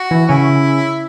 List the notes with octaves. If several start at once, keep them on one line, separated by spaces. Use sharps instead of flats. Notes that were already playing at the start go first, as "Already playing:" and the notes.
Already playing: F#4
E3 E4
C#3 C#4 E4